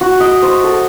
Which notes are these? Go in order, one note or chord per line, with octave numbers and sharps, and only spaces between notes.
F#4
D#5
C5
A4